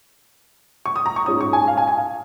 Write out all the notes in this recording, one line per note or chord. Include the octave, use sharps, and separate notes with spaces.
C#6
D#6
A#5
C#6
G#2 G#3 C#4 F4 D#6
C#6
G#5
F5
G#5
G#5
F5